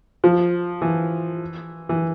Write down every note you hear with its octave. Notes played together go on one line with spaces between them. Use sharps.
F3
E3
E3